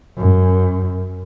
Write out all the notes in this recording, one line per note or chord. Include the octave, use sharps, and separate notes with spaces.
F#2